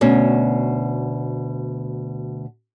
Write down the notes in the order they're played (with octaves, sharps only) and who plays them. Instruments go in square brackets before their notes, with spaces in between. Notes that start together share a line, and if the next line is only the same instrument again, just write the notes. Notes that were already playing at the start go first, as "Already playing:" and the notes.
[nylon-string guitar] D2 B2 C#4